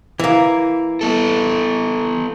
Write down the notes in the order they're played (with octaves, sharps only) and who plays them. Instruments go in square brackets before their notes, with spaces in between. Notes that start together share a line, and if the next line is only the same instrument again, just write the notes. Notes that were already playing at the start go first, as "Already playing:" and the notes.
[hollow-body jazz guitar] E3 A#3
[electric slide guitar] B3 A4